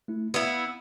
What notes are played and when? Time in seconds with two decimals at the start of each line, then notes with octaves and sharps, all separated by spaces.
0.08 A3 E4
0.34 B3 E4 F5